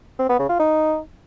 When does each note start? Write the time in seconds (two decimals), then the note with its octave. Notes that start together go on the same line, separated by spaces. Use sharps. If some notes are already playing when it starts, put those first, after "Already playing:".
0.19 C4
0.29 B3
0.39 C#3
0.49 F4
0.59 D#4